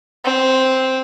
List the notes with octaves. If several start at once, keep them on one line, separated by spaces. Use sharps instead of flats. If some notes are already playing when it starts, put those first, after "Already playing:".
C4